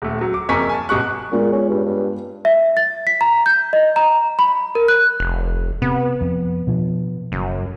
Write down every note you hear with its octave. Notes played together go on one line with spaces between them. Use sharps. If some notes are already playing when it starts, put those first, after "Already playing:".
D#1 A3
F#3
D6
F#1 F2 A#4 G#5 C#6 B6
G#5 A5
G1 B2 G3 C#6 F#6
A#2 G#3 B3 F4
C#4
G2
G2
E5
A6
B6
A#5
G6
D#5
A#5
B5
A#4
F#6
F1
C3 B3
F2
B2 F3
F#1 F#2